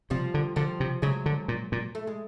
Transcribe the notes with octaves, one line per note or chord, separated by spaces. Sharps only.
C3 F3 G3
D3
D3 F3 G3
C3
C#3 F#3 G#3
D3
A#2
A#2
A3
G#3